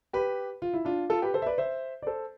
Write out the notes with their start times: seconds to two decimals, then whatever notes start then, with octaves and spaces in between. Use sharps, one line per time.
0.13 G4 B4
0.62 F4
0.73 E4
0.85 D4 F4
1.10 F4 A4
1.22 G4 B4
1.34 A4 C5
1.42 E5
1.46 B4 D5
1.58 C5 E5
2.02 D5
2.07 A4 C5